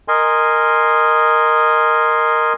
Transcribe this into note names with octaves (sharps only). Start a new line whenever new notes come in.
A#4 D#5 G#5 C6